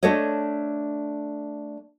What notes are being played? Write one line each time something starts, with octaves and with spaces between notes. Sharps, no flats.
A3 D4 A4 C#5 D#5